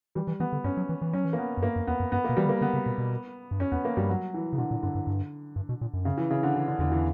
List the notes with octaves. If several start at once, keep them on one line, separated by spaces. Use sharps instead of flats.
E3 G3
E3
E3 B3
D3
G2 C#4
F#3
E3
E3
F#3 C#4
E3
A#3
B3
F#2
G2 A#3
F#2
E2 B3
F#2
G2 B3
B2 A#3
E3 G3
D3
A#3
D3 B3
C#3
B2
B2
G2
F#2 C#4
E2 B3
A#3
G2 G3
F#3
E3
C#3
B2 D3
A#2
G2 D3
G2
G2
G2
B2
A#2
F#2
C#3
E3
C#3
D3
E3
D3
E2 D3
E3